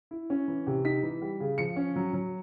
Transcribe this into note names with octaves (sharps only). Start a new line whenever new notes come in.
E4
C#4
E3
C3
D#4 B6
E3
G3
C#3
F3 C#7
C#4
F#3
F#3